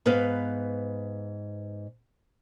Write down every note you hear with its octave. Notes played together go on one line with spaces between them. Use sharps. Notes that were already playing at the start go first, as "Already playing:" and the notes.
G#2 B3 B4 F5